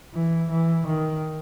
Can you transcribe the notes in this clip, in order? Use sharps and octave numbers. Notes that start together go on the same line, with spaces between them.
E3
E3
D#3